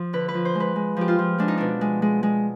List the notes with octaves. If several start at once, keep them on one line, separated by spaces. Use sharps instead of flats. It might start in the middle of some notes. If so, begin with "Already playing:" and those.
Already playing: F3
D3 B4
B4
F3
C5
G#3
B4
G#3
F3 G4
F4
F3
G#3 D4
D#4
B2 D4
G#3
G#3
G#3